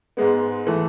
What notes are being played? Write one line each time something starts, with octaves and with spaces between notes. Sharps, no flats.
G#2 G#3 B3
E3 A3